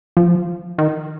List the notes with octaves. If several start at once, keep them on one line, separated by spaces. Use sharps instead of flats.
F3
D#3